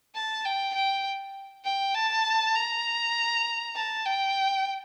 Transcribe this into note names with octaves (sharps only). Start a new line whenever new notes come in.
A5
G5
G5
G5
A5
A#5
A5
G5